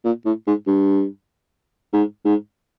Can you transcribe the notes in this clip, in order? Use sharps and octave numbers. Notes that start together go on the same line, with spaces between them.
A#2
A2
G#2
G2
G#2
G#2